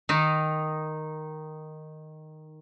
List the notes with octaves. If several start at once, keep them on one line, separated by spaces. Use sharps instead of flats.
D#3 D#4